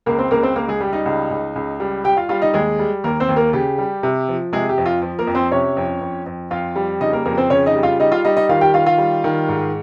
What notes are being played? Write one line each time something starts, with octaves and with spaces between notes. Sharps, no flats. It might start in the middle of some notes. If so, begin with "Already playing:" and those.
C#2 A#3 A#4
C4 C5
C#2 A#3 A#4
C4 C5
C#2 A#3 A#4
G#3 G#4
G3 G4
D#4 D#5
C#2
C#2
C#2
G3
G3 G4 G5
F4 F5
G3 F4 F5
D#4 D#5
D#2 G#3 G#4
G3
D#2 A#3 A#4
C4 C5
D#2
A#3 A#4
C#3 G4
G3
C3
F3
C3 G#3 G#4
G4
F2
F4
F3
A#3 A#4
F2
C4 C5
C3 C#4 C#5
F2
F2
F2
F2 F4 F5
G3
C#3 D#4 D#5
A#3 A#4
F2 A#3 A#4
C4 C5
C#3 C#4 C#5
D#4 D#5
G3
F4 F5
G3 D#4 D#5
F4 F5
G3 D#4 D#5
D#4 D#5
D#3 F4 F5
G4 G5
D#3 F4 F5
F4 F5
G3
D#3
G#2